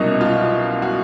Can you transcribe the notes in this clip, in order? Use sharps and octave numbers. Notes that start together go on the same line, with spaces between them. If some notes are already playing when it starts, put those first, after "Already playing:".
Already playing: C2 B2 F#3 A#3 C#4 D#4
F4
F#4